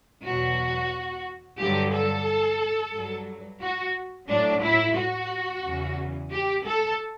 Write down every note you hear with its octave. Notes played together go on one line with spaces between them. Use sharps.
E2 B2 F#3 F#4
G2 D3 F#3 G4
A4
G2 F#3
F#4
A2 F#3 D4
E4
F#4
E2 C#3 E3
G4
A4